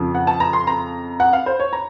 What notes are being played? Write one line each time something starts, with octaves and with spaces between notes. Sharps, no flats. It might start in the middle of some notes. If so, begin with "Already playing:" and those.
Already playing: F2 C#3 F3
F#5
A5
A#5
C6
A#5
F#5
F5
C5
C#5
A#5